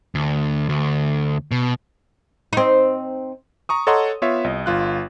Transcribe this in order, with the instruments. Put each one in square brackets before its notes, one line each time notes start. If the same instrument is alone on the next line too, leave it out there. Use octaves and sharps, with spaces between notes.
[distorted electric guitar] D2
D2
B2
[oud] C4 D#4
[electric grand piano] A#5 C#6 D#6
A4 C#5 D#5 F#5 A#5 C6
B3 F4 C#5 E5
C2 D#5
G1 F4 F#6